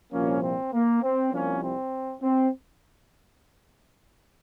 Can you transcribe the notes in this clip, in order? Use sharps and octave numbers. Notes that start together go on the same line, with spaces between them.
C2 A#2 F3 A#3 C#4
C4
A#3
C4
C2 C3 F3 A#3 C#4
C4
C4